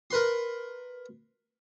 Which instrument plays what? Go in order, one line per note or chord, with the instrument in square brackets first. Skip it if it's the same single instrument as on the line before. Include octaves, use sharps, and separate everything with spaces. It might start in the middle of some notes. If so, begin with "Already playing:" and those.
[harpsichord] A#4 B4 C6